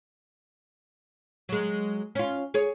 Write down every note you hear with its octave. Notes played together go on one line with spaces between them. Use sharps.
F#3 G#3
C#4 F4
G#4 C#5